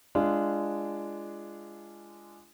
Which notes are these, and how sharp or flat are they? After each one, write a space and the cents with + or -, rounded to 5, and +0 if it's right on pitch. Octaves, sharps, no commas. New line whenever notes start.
G#3 +0 D4 +0 F4 -25